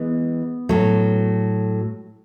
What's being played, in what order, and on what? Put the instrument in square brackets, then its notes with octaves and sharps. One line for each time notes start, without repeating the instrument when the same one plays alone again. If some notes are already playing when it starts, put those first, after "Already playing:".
Already playing: [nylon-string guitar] E3 G#3 [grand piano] B3
[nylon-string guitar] A2 F#3 A3